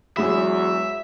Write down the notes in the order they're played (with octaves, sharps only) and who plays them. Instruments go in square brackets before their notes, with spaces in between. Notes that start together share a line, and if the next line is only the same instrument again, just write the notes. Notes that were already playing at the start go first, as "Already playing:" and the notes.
[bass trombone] E2 [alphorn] F#3 [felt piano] G#3 B5 [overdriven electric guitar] E5